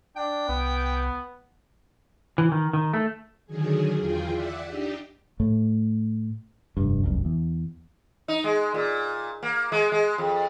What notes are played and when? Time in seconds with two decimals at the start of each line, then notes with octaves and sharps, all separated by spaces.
0.17 D4 G5
0.49 C2 B3
2.38 E3
2.52 D#3
2.73 D#3
2.94 A3
3.46 D3 D#3 F#3 G#4
3.99 E2 F4 G#4 G5
4.30 D5 E5 F#5
4.66 D4 D#4 G4
5.40 A2 A3
6.77 F1 G2
7.03 F1 C2 F#2
7.25 E2
8.28 D#4
8.44 G#3
8.74 A#2
9.43 A#3
9.72 G#3
9.92 G#3
10.18 F2